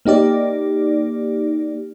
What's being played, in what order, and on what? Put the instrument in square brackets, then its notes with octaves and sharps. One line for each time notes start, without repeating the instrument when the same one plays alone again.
[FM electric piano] A#3 D#4 G4 D5